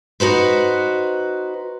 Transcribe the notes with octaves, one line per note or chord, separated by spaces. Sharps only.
D#4 F#4 B4 C5